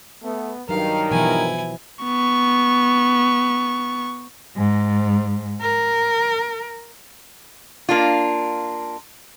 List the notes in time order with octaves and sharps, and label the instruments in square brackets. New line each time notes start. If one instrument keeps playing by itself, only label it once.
[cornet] A3 [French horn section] B3
[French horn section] G2 D#3 [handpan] F#3 [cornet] A#4 [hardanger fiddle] F5
[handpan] B2 E3 F3 [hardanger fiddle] E4 G#5
[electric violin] B3 C#6
[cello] G#2
A#4
[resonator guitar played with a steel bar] A#3 D4 F4